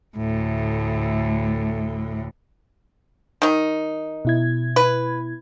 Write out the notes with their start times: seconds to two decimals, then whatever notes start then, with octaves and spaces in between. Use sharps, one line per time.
0.17 D2 A2
3.42 D#3 D#4
4.25 B2 E4 G#6
4.76 B4